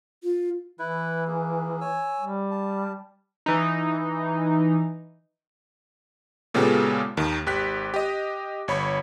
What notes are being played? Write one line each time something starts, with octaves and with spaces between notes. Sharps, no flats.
F4
E3 E4 B4
A#3 G#4
C#5 G#5 E6
G3
A5
E3 D#4
A#2 C#3 G#3 B3 G4 A4
D#2 D#3
G#1 G4 F#6 B6
G4 D#5
G1 C#5 B5